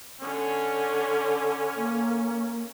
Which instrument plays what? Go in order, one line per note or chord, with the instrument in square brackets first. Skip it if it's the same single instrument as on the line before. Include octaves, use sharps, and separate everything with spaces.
[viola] D3 [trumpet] C#4
[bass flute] A#3